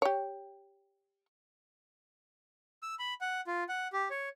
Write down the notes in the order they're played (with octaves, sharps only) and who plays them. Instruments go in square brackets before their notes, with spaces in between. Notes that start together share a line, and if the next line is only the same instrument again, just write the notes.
[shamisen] G4 C#5
[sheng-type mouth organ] E6
B5
F#5
F4
F#5
G4
C#5